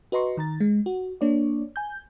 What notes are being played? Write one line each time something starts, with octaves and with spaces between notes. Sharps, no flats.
F#4 B4 D#5 A#5 C6 C#6
D#3 A#5 A6
G#3
F#4
A#3 D4 C#5 D5
G#5 G6